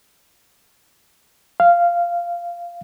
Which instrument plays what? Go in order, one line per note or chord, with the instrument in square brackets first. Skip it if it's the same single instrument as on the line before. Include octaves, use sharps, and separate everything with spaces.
[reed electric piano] F5